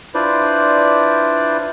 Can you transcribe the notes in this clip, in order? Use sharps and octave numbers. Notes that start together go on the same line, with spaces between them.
D4 E4 F4 B4 C5 D5